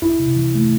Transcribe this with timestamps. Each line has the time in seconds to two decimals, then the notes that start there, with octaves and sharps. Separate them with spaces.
0.02 C#2 E4
0.20 C3
0.36 E3
0.55 A3